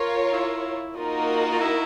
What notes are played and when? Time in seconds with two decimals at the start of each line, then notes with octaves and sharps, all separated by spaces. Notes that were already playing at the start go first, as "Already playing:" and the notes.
Already playing: F4 A#4 C#5
0.32 E4
0.95 A#3 D#4 F4 F#4 A#4 D#5
1.51 F4
1.60 E4